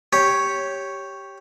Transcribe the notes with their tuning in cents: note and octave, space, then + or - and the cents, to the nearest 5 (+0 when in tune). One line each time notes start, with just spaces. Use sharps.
G4 +0 C#5 +0